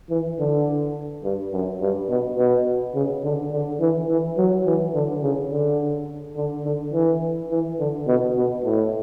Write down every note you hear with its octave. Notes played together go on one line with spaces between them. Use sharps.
E3
D3
G2
F#2
G2
B2
B2
C#3
D3
D3
E3
E3
F#3
E3
D3
C#3
D3
D3
D3
E3
E3
D3
B2
B2
A2